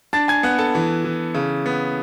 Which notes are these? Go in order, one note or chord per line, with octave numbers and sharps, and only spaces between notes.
D4 A5 A6
G#5 G#6
B3 F#5 F#6
A4 A5
E3
E3
C#3
B3